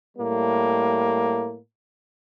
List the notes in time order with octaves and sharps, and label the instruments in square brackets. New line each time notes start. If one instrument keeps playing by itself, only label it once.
[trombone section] A2 G3 A#3